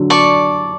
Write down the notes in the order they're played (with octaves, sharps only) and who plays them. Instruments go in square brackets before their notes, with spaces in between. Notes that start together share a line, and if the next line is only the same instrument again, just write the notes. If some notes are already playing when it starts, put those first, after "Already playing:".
Already playing: [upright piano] D3 F#3
[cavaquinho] D5 A5 C#6